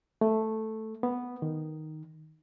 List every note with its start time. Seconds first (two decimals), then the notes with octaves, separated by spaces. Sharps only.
0.21 A3
1.03 B3
1.42 D#3